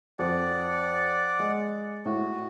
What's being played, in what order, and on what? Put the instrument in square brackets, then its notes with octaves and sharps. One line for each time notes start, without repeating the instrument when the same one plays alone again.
[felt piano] F2 [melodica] D5 F#5
[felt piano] G#3
[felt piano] A2 [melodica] F#4